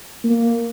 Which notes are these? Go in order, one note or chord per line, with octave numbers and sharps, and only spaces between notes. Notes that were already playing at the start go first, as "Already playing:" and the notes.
A#3